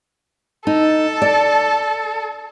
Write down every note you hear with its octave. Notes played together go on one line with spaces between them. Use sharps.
D#4 A4
D5